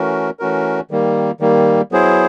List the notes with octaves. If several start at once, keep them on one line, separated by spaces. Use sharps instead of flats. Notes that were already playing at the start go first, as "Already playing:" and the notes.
Already playing: E3 A3 C#4 F#4 A#4
E3 A3 C#4 F#4 A#4
D#3 G3 A#3
D#3 G3 A#3
F#3 B3 E4 G#4 C5